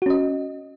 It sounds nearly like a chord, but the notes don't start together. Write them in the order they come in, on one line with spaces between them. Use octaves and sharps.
F#4 C#4 D#5